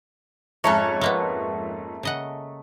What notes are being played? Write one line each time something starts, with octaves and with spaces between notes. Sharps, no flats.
F2 G#2 A3 C#4 A4 C#5 A#5 F#6
G#3 A#3 B3
C#3 D#5 F#5